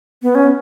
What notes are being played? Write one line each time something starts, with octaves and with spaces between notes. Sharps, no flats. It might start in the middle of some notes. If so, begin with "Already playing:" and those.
B3
C#4